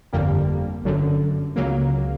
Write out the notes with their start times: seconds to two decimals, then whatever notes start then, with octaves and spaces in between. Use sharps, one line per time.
0.13 G1 F2 D3 G3 A#3
0.84 G1 F#2 D3
1.56 C#2 C#3 F#3 A#3